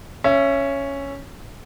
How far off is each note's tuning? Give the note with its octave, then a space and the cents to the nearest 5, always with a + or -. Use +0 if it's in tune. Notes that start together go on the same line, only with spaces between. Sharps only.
C#4 +0 E5 +30